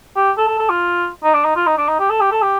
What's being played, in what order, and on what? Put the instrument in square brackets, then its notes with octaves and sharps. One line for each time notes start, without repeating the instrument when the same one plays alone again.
[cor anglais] G4
A4
A4
A4
F4
D#4
D4
D#4
F4
D#4
D4
D#4
G4
A4
G4
A4
G4